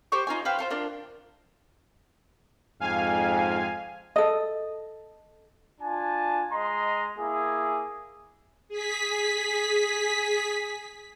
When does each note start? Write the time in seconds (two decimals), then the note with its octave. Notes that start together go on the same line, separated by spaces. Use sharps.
0.12 G4 C5 C#6 D6
0.27 D#4 F4 G#5
0.45 B4 C5 F5 G5
0.59 F4 A4 C5
0.70 D4 F4 A#4
2.80 F2 G#2 F5 G#5
4.16 A4 D#5
5.81 D4 F4 G#5 A5
6.52 G#3 D#5 A#5 C6
7.19 A#3 E4 G#4
8.69 G#4 B6